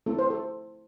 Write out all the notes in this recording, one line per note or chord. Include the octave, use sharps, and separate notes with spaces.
A3 C4 E4 A4
C5
A4